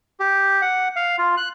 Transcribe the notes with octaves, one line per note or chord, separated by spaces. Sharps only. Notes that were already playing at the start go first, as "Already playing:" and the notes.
G4
F#5
F5
F4
F#6